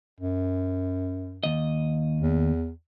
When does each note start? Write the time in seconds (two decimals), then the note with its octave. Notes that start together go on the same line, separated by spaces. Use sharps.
0.20 F#2
1.44 D#2 D#5
2.21 E2